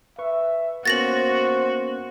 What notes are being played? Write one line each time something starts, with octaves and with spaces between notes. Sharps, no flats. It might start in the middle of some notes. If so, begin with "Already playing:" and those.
B4 E5 C#6
A#3 B3 C#4 F#4 C5 A6 A#6 F#7